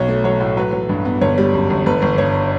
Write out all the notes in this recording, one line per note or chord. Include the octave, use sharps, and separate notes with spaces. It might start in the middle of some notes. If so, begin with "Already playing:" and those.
Already playing: B1 C#5
A3
F#3 C#5
A2
F#3 B4
F#3
G2
B3
G1 C#5
G3
F#2
G1
G1 B4
G1
G2 C#5